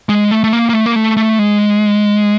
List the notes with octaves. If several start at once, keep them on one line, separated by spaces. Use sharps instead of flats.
G#3
A3
A3
A#3
A#3
A3
A#3
A3
A3
G#3